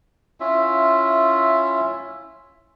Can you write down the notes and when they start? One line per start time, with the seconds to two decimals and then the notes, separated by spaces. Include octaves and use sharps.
0.40 C#4 E4 F4 E5